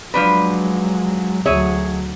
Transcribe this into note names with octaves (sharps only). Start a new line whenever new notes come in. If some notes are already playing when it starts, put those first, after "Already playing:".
F3 F#3 G#3 D4 B4
D2 F#3 G#4 C#5 E5